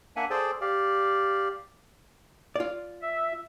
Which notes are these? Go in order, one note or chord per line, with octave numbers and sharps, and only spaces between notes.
A#3 D4 E5 F#5 G#5
G#4 A4 C5 D5 G5 A5
G4 D5 F5
F4 D5
E5